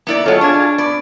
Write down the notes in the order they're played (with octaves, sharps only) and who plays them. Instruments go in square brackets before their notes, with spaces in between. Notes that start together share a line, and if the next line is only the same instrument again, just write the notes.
[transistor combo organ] A#3 [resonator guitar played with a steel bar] B3 E4 D5
[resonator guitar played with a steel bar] F#3 B3 [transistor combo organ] F4 G#4 A5 [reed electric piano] A4 C#5 D#5
[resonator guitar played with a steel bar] D4 [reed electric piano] C#6 G#6
[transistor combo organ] B3 [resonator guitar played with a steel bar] D5